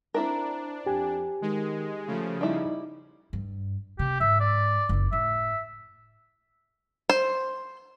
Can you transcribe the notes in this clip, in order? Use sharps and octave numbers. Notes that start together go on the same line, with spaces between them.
C4 D4 E4 A#4
F2 G4 G#5
D#3 G#3
C#3 F3 A3
G3 D#4 E4
G2
C3 G4
G#2 E5
D5
F#1 C#2
A2 E5
C5